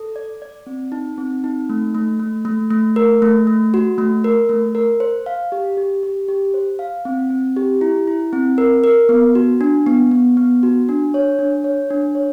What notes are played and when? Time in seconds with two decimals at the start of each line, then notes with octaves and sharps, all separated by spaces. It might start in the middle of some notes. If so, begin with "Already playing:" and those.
Already playing: A4
0.16 D5
0.42 D5
0.67 C4
0.92 D#4
1.18 C4
1.44 D#4
1.70 A3
1.95 A3
2.19 A3
2.45 A3
2.70 A3
2.96 A#4
3.22 A3
3.47 A3
3.74 F#4
3.98 A3
4.24 A#4
4.49 A3
4.75 A#4
5.00 C5
5.26 F5
5.52 G4
5.77 G4
6.03 G4
6.28 G4
6.54 C5
6.79 F5
7.05 C4
7.30 C4
7.57 G4
7.81 E4
8.07 E4
8.33 C4
8.58 A#4
8.84 A#4
9.09 B3
9.35 F#4
9.61 D4
9.87 B3
10.11 B3
10.37 B3
10.63 F#4
10.89 D4
11.14 C#5
11.39 D4
11.64 C#5
11.90 D4
12.15 C#5